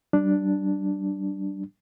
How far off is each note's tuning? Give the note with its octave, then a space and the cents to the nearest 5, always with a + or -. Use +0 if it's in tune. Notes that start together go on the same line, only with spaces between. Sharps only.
G3 -35 D4 +0